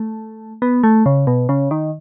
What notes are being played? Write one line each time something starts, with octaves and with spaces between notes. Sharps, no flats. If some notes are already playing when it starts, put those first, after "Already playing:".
Already playing: A3
B3
A3
C#3
B2
C#3
D#3